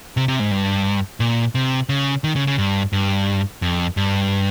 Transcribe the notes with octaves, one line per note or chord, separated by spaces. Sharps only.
C3
C3
G#2
G2
A#2
C3
C#3
D#3
C#3
C#3
G2
G2
F2
G2